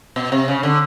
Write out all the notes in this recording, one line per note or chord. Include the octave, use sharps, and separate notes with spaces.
B2
C3
C#3
D3